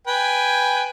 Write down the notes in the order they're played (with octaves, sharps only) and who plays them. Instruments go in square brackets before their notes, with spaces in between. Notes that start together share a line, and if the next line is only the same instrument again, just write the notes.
[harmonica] B4 G5 G#5